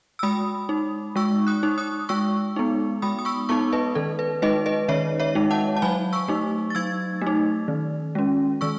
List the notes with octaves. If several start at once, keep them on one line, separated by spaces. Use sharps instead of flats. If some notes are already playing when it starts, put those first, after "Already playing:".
E6
G#3 B5 D#6
D#4
G#3 C#6 E6
D#6 F#6
D#4
D#6 F#6
G#3 C#6 E6
B3 D#4
G#3 B5 D#6
D#6
C#6 E6
B3 D#4 A5 C#6
B4 D#5
D#3 A4
B4
G#3 D#4 B4 D#5
B4 D#5
D#3 C#5 E5
C#5 E5
G#3 D#4
F#5 A5
A5
F#3 G#5 B5
C#6 E6
A3 D#4
A6
F#3 E6 G#6
A3
D#4
D#3
G#3 C#4
D#3 C#6 E6